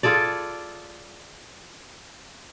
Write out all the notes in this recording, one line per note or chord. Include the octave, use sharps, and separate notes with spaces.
F4 G#4 A4 D5